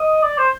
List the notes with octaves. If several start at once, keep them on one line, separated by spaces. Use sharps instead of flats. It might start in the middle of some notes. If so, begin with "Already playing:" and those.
Already playing: D#5
D5
C5